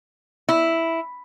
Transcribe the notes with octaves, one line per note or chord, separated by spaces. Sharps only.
E4